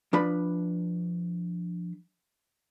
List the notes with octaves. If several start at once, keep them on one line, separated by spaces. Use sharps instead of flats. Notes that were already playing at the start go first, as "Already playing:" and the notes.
F3 D4 B4 B5